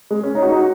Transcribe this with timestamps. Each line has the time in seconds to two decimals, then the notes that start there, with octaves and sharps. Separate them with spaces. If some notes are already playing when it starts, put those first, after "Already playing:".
0.11 G#3
0.23 C#4
0.35 D#4
0.42 F#4
0.49 D#4
0.56 F#4